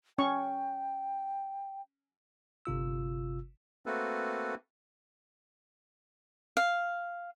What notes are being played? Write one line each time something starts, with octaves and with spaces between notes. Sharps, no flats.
C#4 G5 C#6
G1 C3 F4 E6
A3 A#3 C4 F#4 A4 B4
F5